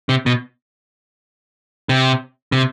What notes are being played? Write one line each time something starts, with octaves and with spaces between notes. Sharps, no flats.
C3
B2
C3
C3